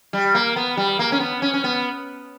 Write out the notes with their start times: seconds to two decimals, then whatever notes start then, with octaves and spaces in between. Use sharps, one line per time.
0.13 G3
0.35 A#3
0.56 B3
0.77 G3
0.99 A#3
1.12 C#4
1.20 B3
1.42 C#4
1.54 C#4
1.64 B3